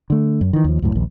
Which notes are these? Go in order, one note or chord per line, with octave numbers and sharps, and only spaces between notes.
D3 A3
F#2
D#3 E3
D#2 F3
C#2 F#2 A2
A#1 D#2